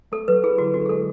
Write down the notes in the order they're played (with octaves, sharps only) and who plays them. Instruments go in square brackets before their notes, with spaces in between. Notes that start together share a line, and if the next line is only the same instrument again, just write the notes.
[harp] A3 [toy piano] A4
[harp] F#3 [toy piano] B4
[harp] E4 [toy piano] G#4
[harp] D3 [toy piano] F#4
[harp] C#4 [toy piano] F#4
[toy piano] G#4
[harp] G#3 [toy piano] A4